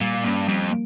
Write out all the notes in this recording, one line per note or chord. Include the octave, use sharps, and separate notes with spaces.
A#2 G3
G2 A#3 C#4
F2 G3
A#3